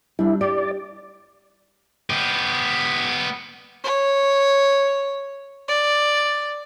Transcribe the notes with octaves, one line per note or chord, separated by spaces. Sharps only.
G3 D4 E4
G4 D5
B3 G4
C#5
D5